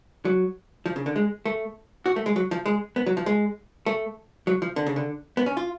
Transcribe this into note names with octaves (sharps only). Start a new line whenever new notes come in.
F#3
F3
C#3
D3
G#3
A3
F#4
A3
G#3
F#3
F3
G#3
B3
F#3
F3
G#3
A3
F#3
F3
D3
C#3
D3
B3
C#4
F4